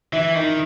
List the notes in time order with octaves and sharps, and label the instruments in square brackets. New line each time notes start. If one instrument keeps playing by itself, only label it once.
[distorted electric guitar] E3 [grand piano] E4 E5
[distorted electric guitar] D#3 [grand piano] D#4 D#5